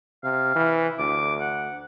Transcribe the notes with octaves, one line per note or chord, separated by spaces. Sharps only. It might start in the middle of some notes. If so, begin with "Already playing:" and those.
C3 F5
E3
D2 D6
F#5